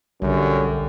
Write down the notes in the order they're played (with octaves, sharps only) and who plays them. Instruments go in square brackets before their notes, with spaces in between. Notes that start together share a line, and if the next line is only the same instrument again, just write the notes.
[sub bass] B1 [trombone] F#2 [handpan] D3 G3